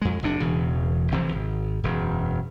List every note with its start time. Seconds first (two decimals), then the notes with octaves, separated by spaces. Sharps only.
0.02 F2 G#3
0.23 F#1 C3 D4
0.40 E1 E2 C#3
1.12 F1 C3 E3 F3
1.32 G#1
1.84 E1 F#2